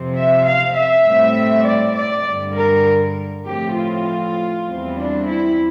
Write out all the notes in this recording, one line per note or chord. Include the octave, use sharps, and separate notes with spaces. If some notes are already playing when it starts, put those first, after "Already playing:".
Already playing: F2 C3 F3 C4
E5
F5
E5
A2 G3 C4
D5
D5
G2 D3 G3
A#4
A2 F3 C4 G4
F4
E2 E3 G3 C4
D4
E4